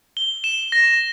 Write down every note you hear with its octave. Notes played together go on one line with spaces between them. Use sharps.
G7
E7
A#6